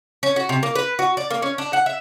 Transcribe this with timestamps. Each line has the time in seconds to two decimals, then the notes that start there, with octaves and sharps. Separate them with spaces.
0.23 C#4
0.36 F#4
0.49 C3
0.63 A#3
0.75 B4
0.99 F#4
1.17 D5
1.30 A#3
1.42 C#4
1.58 D4
1.73 F#5
1.86 E5